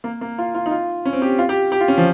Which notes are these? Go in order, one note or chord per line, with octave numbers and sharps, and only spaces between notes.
A#3
A#3
F4
F4
D#4
F4
C#4
C4
G4
F4
G4
G4
F4
C#4
F3